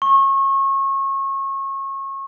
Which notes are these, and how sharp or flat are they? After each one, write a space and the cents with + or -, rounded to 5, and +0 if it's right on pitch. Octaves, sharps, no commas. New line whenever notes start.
C#6 -30